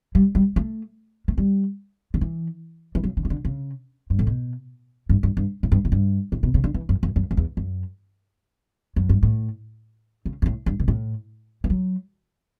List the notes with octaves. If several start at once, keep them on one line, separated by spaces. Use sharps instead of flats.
G3
G3
A3
A3
G3
D3
E3
E3
F#3
D3
E3
D3
C#3
G2
A2
B2
G2
G2
G2
A2
G2
A2
G2
A2
B2
C#3
D3
E3
F#2
F#2
F#2
F#2
E2
F#2
F#2
G2
A2
C#3
G2
A2
G2
B2
A2
E3
F#3